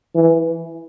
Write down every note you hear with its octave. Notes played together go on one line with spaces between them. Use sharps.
E3